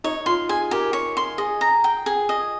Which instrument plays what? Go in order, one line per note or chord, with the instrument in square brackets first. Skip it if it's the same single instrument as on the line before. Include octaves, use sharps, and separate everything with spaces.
[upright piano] D#4 [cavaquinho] C#5
[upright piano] F4 [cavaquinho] C6
[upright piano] G#4 [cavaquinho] G#5
[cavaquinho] G4 [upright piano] A#4
[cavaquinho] C#5
C6
[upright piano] G#4 [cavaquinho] D#5
[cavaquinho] A#5
G5
G#4
D#5